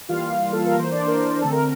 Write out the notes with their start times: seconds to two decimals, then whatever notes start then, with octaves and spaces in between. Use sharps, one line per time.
0.09 E3 G3 A#3 F4 F5
0.52 A4
0.66 A#4
0.75 E3 A#3 C5
0.91 D4 D5
1.03 C5
1.08 A#4
1.41 D3 A3 C4 A4
1.52 A#4